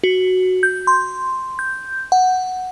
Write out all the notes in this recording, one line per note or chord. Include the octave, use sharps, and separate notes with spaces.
F#4
G6
C6
G6
F#5